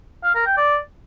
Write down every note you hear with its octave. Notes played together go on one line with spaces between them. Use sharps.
F5
A#4
G5
D5